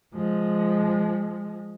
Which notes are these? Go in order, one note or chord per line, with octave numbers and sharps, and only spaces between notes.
F3 G#3